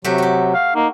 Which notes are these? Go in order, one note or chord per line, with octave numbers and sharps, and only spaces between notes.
C3 F#3 A3 F#4 G4
F#4 G4
F5
A#3 D#4